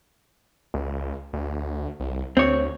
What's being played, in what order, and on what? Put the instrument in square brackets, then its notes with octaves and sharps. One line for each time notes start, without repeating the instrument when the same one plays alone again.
[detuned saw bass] C#2
D2
C2
[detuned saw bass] D2 [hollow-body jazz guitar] C4 C#5